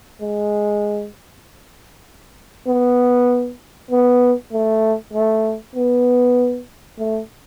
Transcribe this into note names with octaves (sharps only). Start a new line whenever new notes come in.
G#3
B3
B3
A3
A3
B3
A3